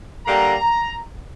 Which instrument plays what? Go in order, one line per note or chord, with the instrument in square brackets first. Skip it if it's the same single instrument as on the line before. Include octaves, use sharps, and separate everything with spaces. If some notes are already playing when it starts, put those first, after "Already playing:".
[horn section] D3 G3 A#3 A#5